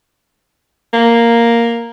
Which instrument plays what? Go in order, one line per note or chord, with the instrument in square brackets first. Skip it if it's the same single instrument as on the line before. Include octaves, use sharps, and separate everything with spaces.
[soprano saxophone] A#3